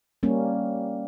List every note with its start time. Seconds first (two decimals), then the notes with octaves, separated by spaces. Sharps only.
0.23 G3 A#3 C#4